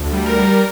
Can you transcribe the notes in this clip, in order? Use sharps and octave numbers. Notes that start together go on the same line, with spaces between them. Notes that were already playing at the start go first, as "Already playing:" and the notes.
Already playing: D2
G3
A#4
G3